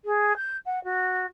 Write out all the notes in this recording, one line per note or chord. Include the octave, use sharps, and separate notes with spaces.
G#4
G6
F#5
F#4